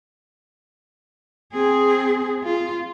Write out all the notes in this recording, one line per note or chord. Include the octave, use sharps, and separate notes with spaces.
C4 G#4
F4